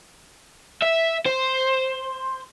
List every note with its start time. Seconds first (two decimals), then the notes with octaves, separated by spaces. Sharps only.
0.82 E5
1.26 C5